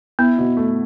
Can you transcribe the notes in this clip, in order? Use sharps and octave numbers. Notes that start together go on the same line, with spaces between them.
B3 E4
B2
A3